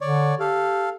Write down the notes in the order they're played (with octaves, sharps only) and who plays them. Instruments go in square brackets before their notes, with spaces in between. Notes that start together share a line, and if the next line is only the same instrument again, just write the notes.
[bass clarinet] D3 [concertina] C#5 D5
[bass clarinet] G4 [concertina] A4 F5